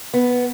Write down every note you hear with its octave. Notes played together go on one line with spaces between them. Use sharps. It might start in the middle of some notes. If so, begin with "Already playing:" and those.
B3